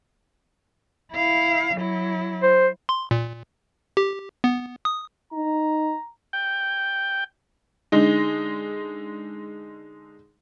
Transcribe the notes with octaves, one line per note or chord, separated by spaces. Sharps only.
E4 F5
F#3 E4
C5
C6
A#2
G4
B3
D#6
D#4 A#5
G5
D3 G#3 D#4